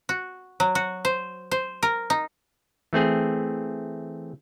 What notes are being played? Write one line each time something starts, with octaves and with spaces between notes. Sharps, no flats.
F#4
F#3
F#4
C5
C5
A#4
D#4
E3 A3 C4 G#4